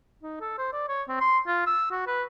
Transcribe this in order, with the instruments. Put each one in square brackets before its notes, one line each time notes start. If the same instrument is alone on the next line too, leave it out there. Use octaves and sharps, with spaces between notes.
[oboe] D#4
A4
C5
D5
C#5
C4
C6
F4
E6
F#4
B4